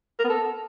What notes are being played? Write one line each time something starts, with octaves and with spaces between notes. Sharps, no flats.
A#4
B3
A4